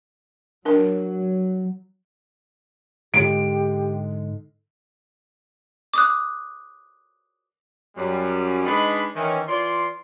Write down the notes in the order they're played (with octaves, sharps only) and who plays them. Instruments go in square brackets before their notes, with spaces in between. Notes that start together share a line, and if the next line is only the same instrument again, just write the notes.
[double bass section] F#3 [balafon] D4 A#4
[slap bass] G#2 D3 G#3 [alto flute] G4 [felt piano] D7
[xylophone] D6 D#6 F#6
[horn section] F#2 G3
G#3 D4 D#4 B4 B5
D#3 E3 C#4
E3 F4 D5 C6